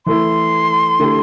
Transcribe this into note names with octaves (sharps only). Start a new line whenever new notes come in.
E3 A3 E4 C6
D3 A3 E4 G4